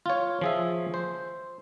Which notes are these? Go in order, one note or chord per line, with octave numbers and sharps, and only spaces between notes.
F4 C#5
F3 G#4 E5
C5